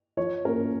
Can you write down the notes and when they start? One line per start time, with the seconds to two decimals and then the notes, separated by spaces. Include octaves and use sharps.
0.17 F3 C#5
0.45 A#3 C#4 A#4